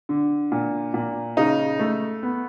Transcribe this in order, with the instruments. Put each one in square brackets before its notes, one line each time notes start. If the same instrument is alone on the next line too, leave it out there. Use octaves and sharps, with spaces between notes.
[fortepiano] D3
A#2
A#2
C#3 D#4
A3
B3